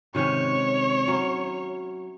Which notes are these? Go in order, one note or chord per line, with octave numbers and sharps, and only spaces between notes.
C3 D#3 G#3 C#4 C#5
F#3 C#4 E4